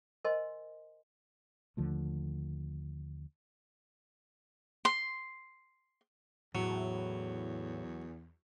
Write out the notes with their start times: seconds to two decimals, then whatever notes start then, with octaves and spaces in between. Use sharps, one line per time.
0.25 A#4 C5 D#5 G#5 C6
1.77 D#2 D3 F3 A3
4.85 C6
6.55 E2 A2 F#3